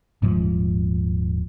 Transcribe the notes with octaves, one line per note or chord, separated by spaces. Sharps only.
D#1 G#2 F3